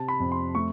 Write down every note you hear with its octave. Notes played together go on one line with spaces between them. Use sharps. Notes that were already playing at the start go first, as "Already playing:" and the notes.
Already playing: C3 A5
B5
F2
C6
A3 C#6